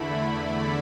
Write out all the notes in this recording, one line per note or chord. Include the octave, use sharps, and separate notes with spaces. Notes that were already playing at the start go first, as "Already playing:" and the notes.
Already playing: E2 D3 A3 E4 B5
D5